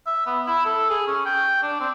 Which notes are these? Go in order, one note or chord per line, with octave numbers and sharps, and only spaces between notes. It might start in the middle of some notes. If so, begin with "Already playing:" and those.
E5
B3
E4
A4
G#4
C#4
G5
D4
C4